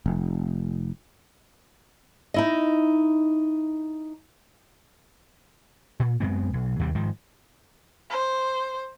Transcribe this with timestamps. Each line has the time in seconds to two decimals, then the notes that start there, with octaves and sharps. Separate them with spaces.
0.06 F1
2.34 D#4 E4 D#5
6.00 A#2
6.20 F#2 G#3 B3 C4
6.53 B1
6.79 D#2 C3 G3
6.95 G#2 D#3 F3
8.10 C5